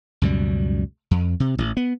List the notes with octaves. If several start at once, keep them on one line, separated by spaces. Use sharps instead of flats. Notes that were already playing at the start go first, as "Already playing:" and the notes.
C#2 F#2 B2 G3
F2
C3
A1
B3